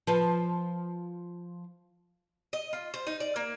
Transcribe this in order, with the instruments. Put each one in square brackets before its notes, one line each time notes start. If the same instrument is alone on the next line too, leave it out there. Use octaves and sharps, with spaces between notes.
[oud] F3 B4
[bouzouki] D#5
F4
C5
D#4
D5
A#3